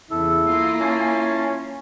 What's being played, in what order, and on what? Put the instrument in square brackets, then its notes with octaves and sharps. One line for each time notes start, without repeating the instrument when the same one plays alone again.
[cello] E2 C#3 [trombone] E4 [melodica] A4
[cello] A#3 F4
[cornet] C#4 [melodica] G#5 A5